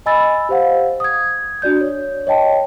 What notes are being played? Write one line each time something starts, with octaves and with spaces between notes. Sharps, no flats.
D#5 G#5 B5 E6 A6
G4 C5 F5 F#5
D#6 G#6
D4 F#4 D5 G6
C#5
C#5 D#5 G5 A5